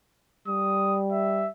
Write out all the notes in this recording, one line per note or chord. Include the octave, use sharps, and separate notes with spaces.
G3 D#6
E5